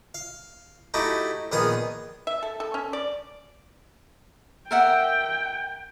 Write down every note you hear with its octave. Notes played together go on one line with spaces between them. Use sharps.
F5
A3 D#4 E4 F#4 G4
A#1 D#3 B3 G#4 D#6
E5
A4
A4
C#4
D5
A#4 E5 F#5 G5